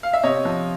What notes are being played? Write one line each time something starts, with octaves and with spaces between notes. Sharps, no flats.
F5
E5
C3 C#5 D#5
F3